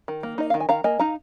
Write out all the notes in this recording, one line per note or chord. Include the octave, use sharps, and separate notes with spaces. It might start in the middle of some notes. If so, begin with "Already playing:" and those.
D#3
A#3
D#4 D#5
D#3 F5
G#5
D#3 F5 A#5
A#3 D#5 G#5
D#4 F5 A#5